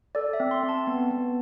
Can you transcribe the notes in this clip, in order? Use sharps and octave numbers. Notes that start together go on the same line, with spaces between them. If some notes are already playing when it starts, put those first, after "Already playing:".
A4 D5
E5
C4
C6
C4
A5
B3
B3